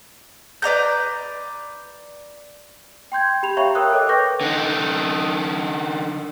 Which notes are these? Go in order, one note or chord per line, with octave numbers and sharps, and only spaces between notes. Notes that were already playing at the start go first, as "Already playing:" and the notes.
B4 D5 A#5 G6
G5 C6 G6 G#6
G4 B5 F7
C#5 E5 F5 G5 A#5 C#6
A#4 G5 D#6 E6 F#6
A4 C#5 D#5 D6
B4 G5 C#6 D6 G6 A#6
D3 D#4